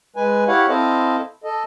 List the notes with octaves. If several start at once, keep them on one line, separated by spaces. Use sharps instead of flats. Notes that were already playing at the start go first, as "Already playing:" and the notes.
G#3 B4 G#5
E4 G4 C#5 F5 F#5
C4 E4 A4 C5 D#5 F5
A4 D#5